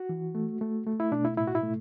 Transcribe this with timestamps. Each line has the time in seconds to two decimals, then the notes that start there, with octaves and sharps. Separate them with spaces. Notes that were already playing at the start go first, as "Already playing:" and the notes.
Already playing: F#4
0.09 E3
0.35 A3
0.61 A3
0.87 A3
1.00 E4
1.12 B2 D4
1.25 E4
1.37 A2 E4
1.47 F#4
1.55 E4
1.63 A3